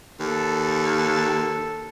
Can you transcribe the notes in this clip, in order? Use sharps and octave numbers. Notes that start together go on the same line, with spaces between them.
D#2 A4